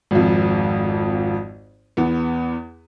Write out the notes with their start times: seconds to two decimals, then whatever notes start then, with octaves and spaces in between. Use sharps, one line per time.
0.11 G#1 F2
1.97 E2 B3